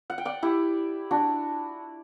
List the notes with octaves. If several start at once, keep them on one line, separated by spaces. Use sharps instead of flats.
F#5
G5
D5 F#5
E4 G4
D4 F#4